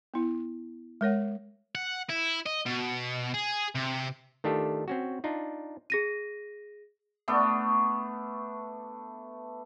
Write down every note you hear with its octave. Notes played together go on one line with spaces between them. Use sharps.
B3 E4
G#3 A#4 C#5 F#5
F#5
E4
D#5
B2
G#4
C3
D#3 A3 D4 F4 G4 A4
C4 C#4 F#4
D4 D#4 F4
G#4 A#6 D#7
A3 B3 D4